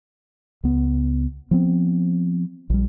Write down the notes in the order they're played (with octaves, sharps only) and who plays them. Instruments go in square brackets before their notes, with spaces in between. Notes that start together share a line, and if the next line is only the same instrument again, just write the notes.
[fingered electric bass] C#2 B3
F3 B3 C4
A#1 G3